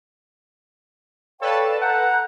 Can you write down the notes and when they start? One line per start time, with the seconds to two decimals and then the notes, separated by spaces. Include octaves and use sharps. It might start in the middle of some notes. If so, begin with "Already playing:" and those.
1.41 A4 B4 C#5 D5 F5 G5 A5
1.82 F#5 A#5 F#6 G6